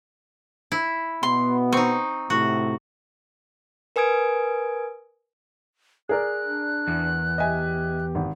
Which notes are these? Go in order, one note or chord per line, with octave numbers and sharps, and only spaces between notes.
E4
B2 B3 C6
C4 D#4 C#6
A2 C3 F#4
A#4 B4 G#5 D#6 G#6 D7
G#4 A#4 D5 F#6
D4
E2
G4 D#5 E5 G#5
G#1